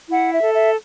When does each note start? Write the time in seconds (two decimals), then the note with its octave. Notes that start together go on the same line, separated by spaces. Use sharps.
0.10 E4 F#5
0.32 E5
0.43 A4
0.54 E5